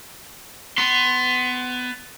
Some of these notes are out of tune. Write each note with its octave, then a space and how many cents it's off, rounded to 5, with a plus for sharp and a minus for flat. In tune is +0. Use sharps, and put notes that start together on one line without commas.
B3 +20 C6 +0